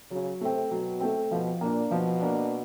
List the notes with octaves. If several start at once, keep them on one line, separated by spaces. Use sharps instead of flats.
C#3 F#3
C3 A3 C4
B2 F#3
A3 C4
B2 F3
A#2 A#3 D4
B2 F3
A#3 D4